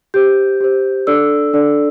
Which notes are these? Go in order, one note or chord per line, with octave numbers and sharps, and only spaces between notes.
G4 C5 G6
G4 C5
D4 A4 D5 E6
D4 A4 D5